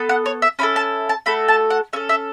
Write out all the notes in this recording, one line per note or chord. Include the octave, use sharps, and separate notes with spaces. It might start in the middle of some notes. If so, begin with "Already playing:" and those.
Already playing: B3 A4
F#5
C#5
E5
C#4 E4 A4 B5
A5
A5
A3 F#4 A4 B5
A5
F#5
C#4 A4 E5
E5